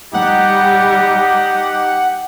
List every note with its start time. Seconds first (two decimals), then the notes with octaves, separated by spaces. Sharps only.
0.14 G3 D#4 G4 F#5